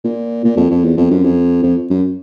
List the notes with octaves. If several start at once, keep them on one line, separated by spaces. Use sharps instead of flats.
A#2
A#2
F2
F2
E2
F2
F#2
F2
F2
F#2